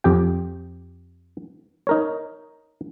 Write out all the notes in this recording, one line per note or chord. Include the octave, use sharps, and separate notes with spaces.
F2 G4 G5
D#4 A#4 C#5